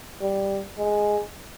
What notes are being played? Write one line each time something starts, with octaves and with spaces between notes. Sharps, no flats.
G3
G#3